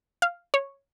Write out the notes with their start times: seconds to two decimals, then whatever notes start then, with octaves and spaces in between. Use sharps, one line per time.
0.22 F5
0.54 C#5